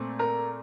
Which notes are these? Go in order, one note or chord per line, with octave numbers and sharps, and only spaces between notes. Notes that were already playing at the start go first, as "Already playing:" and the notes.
Already playing: A#2 A3 C4
A#4